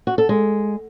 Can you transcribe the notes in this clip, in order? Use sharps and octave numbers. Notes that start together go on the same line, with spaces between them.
F#4
A4
G#3